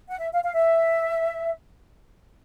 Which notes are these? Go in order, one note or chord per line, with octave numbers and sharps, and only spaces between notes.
F#5
E5
F5
F5
E5